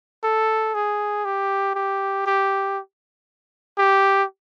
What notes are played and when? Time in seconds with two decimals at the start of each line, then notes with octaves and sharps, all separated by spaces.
0.24 A4
0.75 G#4
1.25 G4
1.75 G4
2.27 G4
3.78 G4